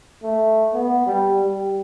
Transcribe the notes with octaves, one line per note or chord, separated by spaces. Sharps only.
A3
B3
G3
G3